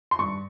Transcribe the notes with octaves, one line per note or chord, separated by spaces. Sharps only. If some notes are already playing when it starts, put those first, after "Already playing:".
C6
G2 C#6